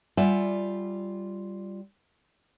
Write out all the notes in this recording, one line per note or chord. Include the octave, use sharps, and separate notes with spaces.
G3 F4 D5 E5 F#5 G#5